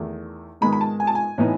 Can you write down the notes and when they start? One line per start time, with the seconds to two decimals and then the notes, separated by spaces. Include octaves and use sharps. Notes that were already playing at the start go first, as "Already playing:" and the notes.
Already playing: E2 D#3 A3 D#4
0.61 G#2 D#3 G#3 B3 B5
0.73 B5
0.81 A5
1.00 G#5
1.07 A5
1.15 G#5
1.38 A2 E3 B3 D#4